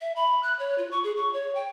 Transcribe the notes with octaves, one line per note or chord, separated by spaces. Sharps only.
E5
B5
F#6
C#5
F4
C#6
G#4
C#6
C#5
G5